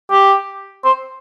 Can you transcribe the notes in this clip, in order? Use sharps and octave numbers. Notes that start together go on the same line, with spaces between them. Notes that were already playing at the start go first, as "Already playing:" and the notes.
G4
C5